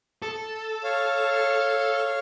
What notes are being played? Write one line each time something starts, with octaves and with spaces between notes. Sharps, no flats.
A4
C#5 F5